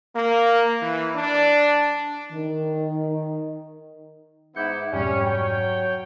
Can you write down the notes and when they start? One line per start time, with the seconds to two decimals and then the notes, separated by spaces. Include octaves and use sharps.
0.16 A#3
0.81 E3
1.16 D4
2.32 D#3
4.56 G#2 B3 E4 D6 G6 C#7
4.93 F2 G#2 B2 G3 C#4
5.25 F#3 C#5 G5